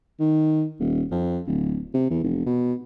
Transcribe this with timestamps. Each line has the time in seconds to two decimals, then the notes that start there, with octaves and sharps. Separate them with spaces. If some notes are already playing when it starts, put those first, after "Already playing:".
0.20 D#3
0.80 D#1
1.11 F2
1.47 D1
1.94 C3
2.10 E2
2.24 F1
2.46 B2